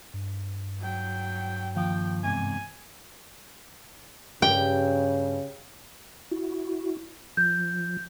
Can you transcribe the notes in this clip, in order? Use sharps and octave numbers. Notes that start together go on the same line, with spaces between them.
G2
F#3 G5
D#2 F3 F5 G5
E2 G#2 C3 G#5
G2 C#3 G4 G5
E4 F#4
F3 G6